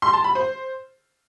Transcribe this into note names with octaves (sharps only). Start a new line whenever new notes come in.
C6
A5
B5
C5